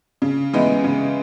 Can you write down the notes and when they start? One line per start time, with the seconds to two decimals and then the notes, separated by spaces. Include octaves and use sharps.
0.22 C#3
0.54 E3 G#3 B3 D#4
0.84 C#3